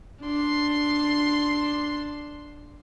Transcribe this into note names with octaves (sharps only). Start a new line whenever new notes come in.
D4 C6